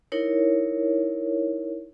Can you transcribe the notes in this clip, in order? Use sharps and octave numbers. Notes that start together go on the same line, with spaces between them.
D#4 E4 A#4 C#5